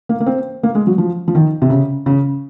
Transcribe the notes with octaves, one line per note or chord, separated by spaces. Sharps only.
A#3
A#3
C4
A#3
G#3
F#3
F3
F3
D#3
C3
C#3
C#3